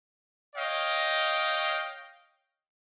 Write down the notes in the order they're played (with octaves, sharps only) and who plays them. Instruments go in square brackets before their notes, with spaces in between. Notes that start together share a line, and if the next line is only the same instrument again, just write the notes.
[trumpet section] C#5 D#5 F5 G5